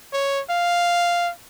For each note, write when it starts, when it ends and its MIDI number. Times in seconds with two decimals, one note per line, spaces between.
0.13 0.41 73
0.50 1.31 77